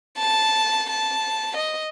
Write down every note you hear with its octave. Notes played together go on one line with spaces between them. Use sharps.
A5
A5
D#5